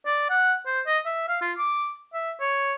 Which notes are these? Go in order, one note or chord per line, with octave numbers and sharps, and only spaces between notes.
D5
F#5
C5
D#5
E5
F5
F4
D6
E5
C#5